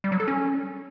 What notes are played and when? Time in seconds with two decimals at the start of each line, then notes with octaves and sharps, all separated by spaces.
0.04 G3
0.12 F#3
0.20 A4
0.28 C#4